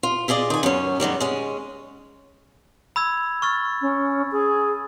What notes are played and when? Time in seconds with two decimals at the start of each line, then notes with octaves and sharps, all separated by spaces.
0.03 F4
0.28 E4 F4 G#4 D5 D#5
0.50 D#3 G#5
0.63 F#2 C#4
1.00 G#2 D#3 F#3 G3
1.21 G#3 C#4
2.96 B5 E6 G#6
3.42 C#6 F6 A6
3.82 C#4
4.32 G#4